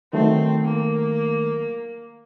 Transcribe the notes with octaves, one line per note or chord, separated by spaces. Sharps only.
D#3 F#3 A3 C4
A#3